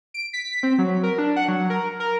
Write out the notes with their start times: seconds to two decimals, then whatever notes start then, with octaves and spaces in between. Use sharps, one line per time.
0.14 D7
0.33 B6
0.63 C4
0.78 F#3
1.03 A#4
1.18 D4
1.36 F#5
1.48 F#3
1.70 A#4
2.00 A#4